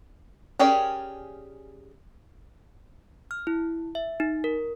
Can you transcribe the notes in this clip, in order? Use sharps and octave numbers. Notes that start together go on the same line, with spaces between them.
C#4 G4 G#4 A#4 D5
F6
E4
E5
D#4
A#4